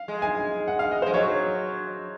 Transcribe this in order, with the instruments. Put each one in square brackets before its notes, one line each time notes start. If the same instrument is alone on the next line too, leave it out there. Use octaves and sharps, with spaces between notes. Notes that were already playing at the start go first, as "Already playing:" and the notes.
Already playing: [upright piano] F5
[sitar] G#3
[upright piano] G#5
F#5
F5
D#5
C5
[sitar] G#3
[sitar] F#3 [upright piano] C#5